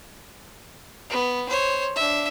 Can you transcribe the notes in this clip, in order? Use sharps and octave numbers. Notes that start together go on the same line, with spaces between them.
B3
C5 C#5
D4 E5